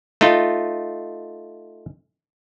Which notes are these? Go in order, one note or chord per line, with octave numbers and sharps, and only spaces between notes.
A3 D#4 F4